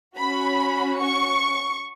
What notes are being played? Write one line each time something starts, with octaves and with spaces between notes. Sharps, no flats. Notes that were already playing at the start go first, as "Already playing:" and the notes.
C#4 F#4 B5
C#6